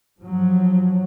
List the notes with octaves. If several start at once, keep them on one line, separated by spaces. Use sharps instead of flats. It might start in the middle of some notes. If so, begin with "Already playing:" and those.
G2 F3 F#3